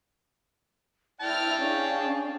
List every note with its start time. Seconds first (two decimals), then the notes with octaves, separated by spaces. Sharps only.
1.21 E4 D5 G5 A5 F6
1.58 C#4 D4 G#4 F5